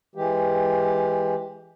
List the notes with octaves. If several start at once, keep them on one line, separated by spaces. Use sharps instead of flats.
E3 G#3 G4